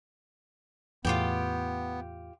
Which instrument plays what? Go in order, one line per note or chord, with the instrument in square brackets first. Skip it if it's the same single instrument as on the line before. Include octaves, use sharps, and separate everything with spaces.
[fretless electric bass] E2 A2 [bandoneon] B3 [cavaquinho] F4 G4 G5